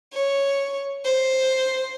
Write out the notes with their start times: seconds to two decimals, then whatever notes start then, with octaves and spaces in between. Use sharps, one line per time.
0.14 C#5
1.05 C5